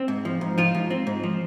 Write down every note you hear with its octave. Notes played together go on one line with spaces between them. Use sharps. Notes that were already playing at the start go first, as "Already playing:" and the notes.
Already playing: C4
G#2
F3
G#2
F3 F4
G#2
C4
G#2
F3